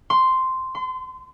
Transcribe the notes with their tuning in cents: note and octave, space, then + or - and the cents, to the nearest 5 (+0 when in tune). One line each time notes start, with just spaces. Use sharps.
C6 -5
C6 -30